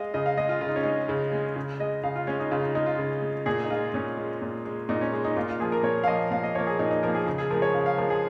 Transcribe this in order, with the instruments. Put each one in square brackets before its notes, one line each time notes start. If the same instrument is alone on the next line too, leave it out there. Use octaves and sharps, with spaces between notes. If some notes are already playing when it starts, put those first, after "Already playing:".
Already playing: [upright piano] G#3 D#5 F5
C#3 D#5
F5
G#3 D#5
F4
C#3 F4
D#4
C#4
G#3 D#4
C#3
G#3
C#3
G#3 D#5
C#3 F5
F4
G#3 C#4
D#4
C#3 F4
D#4
G#3 D#4
F4
C#3
G#3
A#2 G#4
D#4
G#3 F4
A#2 C#4
G#3
A#2
G#3
A#2 D#4
C#4
G#3 D#4
D#4
A#2 F4
F4
F3 A#3 G#4
A#4
A#2 C#5
F5
F3 A#3 D#5
A#2 F5
D#5
F3 A#3 C#5
G#4
A#2 D#4
D#4
F3 A#3 A#4
G#4
C#3
G#4
F3 A#4
G#3
C#5
C#3 F5
F5
F3 G#3 A#4
G#4